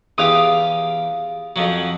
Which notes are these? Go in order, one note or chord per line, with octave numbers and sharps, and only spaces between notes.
E2 G4 F5 D#6
F2 F3 F#3